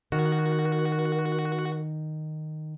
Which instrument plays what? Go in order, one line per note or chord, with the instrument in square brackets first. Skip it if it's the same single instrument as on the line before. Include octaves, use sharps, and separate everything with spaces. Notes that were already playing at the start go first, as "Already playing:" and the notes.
[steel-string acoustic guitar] D#3 [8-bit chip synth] F#4 [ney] A#4